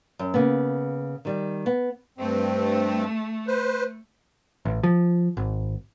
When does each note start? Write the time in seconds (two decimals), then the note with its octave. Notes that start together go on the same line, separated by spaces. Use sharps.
0.19 F#2
0.34 C#3 A#3 B3
1.25 D#3 G3
1.66 B3
2.18 G2 A3 C4
3.47 B4 C5
4.65 A1
4.83 F3
5.37 G#1